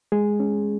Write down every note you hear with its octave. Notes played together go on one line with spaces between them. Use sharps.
G#3 G#4
C#4